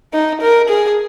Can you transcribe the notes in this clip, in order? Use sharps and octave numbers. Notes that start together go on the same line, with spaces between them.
D#4
A#4
G#4